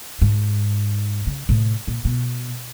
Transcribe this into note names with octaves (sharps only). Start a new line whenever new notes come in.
G#2
C#3
A2 C3
A#2
B2